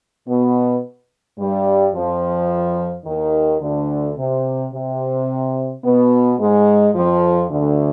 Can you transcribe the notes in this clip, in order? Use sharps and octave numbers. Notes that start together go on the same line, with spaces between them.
B2 B3
G2 G3
F2 F3
D#2 D#3
D2 D3
C3
C3
B2 B3
G#2 G#3
F2 F3
D2 D3